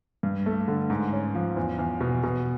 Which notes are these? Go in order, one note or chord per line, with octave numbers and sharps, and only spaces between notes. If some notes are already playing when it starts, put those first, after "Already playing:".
G2
A3
D3
G#2
C#4
F3
E2
E2
B2
B2